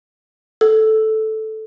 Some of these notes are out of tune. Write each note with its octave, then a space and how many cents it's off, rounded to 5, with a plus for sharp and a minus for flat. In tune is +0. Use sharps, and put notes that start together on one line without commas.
A4 -10